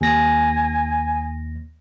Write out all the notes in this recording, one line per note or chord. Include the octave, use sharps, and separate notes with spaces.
D#2 G#5 A#6